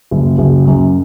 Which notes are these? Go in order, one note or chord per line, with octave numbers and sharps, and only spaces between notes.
F#1
F#1
F#2